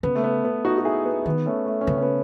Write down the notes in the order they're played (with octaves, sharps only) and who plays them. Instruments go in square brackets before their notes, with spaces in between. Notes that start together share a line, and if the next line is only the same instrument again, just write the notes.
[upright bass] C#3 [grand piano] B3
[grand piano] A3
B3
B3
D#4 F#4
F#4
E4 G#4
B3
[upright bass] D#3 [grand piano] B3
[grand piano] A3 C#4
A3
C#4
[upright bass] C#3 [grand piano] B3
[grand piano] C#4
B3